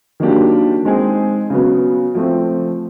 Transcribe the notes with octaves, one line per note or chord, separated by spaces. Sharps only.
D#3 F#3 A#3 D4 G4
G#3 C4 D#4 G#4
C#3 F#3 B3
F3 A3 C4